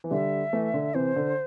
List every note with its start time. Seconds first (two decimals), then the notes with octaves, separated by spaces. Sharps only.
0.04 E3
0.11 D3 G3 E5
0.53 E3 A3
0.74 D3
0.94 C3 E3 C5
1.16 D3